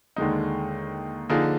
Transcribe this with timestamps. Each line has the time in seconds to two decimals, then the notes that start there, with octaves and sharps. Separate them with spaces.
0.16 D#2 D3 G#3 D#4
1.29 D3 F3 A#3 D#4 G#4